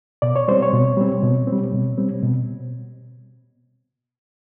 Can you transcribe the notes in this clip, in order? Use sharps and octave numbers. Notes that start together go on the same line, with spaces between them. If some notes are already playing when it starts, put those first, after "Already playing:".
B2 D5
C#5
G3 C4 C5
C#5
B2
G3 C4
B2
C4
G3
B2
G3 C4
B2